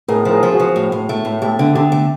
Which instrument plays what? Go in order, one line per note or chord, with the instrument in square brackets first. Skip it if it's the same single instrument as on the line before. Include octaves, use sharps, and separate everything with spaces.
[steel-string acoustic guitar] A2 [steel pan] G#4 A#4
[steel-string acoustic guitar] F3
[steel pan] G#4 A#4
[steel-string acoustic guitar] F3
[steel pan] F#4 G#4
[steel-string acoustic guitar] F3
A2
A2
A3
A2
[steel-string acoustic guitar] A3 [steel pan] G4 A4
[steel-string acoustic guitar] D3
[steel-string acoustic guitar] D3 [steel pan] G4 A4
[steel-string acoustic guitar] A3